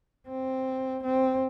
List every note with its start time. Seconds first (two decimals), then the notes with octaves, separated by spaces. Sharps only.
0.28 C4
1.04 C4